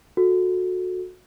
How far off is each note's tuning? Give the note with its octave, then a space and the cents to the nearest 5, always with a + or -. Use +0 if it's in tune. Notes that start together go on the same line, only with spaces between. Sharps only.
F#4 -20 A4 +0